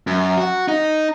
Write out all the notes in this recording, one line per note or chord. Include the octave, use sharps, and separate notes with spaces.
F#2
F#4
D#4